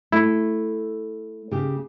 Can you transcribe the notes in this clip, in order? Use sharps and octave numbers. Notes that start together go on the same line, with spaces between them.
A3 E4
C#3 G4